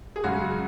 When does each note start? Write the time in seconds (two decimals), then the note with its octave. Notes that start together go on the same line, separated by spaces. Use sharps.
0.16 G#4
0.24 F#2 C#3 G#3 F#4